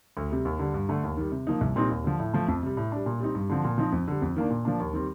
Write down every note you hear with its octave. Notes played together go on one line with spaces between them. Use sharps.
D2
C3 G3
D#2
D3 G3
G2
D3 A3
D#2
D#3 G3
C3
F3 A#3 D#4
C2
A#2 G3 C4 D#4
D#2
D3 F3
A2
F3 A3
F2
C3 G3
A2
G3 D4
A#2
G3 C4 D#4
G2
D3 F3 C4
A#2
F3 C4 D#4
F2
D3 G3
F2
D#3 A#3 D4
A#2
F3 A#3 D4
D#2
D#3 G3 C4